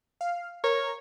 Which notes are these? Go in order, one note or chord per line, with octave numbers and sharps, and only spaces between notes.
F5
A#4 C#5